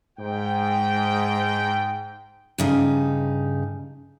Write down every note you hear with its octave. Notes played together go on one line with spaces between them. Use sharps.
G#2 G5
G2 C#3 D#4